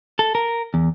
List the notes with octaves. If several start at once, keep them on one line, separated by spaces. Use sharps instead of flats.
A4
A#4
E2